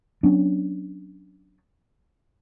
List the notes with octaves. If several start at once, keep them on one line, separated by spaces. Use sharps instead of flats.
F#3 B3 C#4 D4